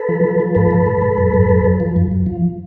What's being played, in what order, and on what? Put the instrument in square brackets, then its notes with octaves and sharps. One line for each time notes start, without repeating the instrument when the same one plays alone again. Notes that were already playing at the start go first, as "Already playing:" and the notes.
Already playing: [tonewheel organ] A4 B4
F3
F3
F3
G#2 A4 B4
G#2
G#2
G#2
F#2
F#2
F#2
F#2
F3
F#2
F#2
F3